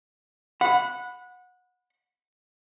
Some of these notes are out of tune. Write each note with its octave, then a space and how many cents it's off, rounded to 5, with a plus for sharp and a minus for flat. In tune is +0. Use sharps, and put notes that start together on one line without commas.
F#5 -20 B5 +10